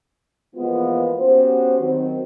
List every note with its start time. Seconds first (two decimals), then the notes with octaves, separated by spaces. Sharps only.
0.55 E3 F3 G#3 A#3 B3 F4
1.18 B3 C#4 F#4 G4 C5
1.80 D#3 F#3 C4